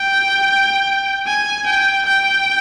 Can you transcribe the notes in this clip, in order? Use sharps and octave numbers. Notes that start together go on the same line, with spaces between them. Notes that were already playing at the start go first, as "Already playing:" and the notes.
Already playing: G5
G#5
G5
G5